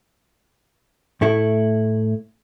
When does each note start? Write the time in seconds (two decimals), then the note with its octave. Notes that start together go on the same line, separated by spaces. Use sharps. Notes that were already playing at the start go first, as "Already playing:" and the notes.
1.21 A2 A3 E4